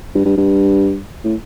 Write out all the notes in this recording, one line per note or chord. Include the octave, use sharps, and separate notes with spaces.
G2
G2
G2
A2